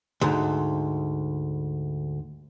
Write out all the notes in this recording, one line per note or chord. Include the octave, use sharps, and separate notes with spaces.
D2 G#2